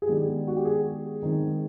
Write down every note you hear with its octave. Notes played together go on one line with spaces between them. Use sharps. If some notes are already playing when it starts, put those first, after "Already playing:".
G#4
D#3 G#3 B3 D4 G4
F#4
G4
G#4
D#3 G#3 C4